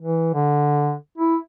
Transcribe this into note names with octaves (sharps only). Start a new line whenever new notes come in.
E3
D3
E4